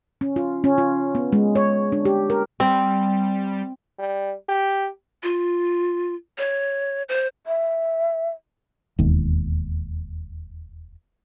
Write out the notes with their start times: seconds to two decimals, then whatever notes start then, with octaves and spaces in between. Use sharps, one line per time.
0.21 C#4
0.36 F4
0.64 C#4
0.78 F4
1.15 B3
1.33 G#3
1.55 C#5
1.92 D4
2.05 G4
2.30 A#4
2.60 G3 C4
3.99 G3
4.48 G4
5.23 F4
6.38 C#5
7.09 C5
7.47 E5
8.99 E1 D#2